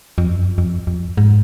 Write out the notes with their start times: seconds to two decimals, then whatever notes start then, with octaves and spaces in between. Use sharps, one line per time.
0.18 F2
0.28 F#2
0.58 F2
0.87 F2
1.17 G#2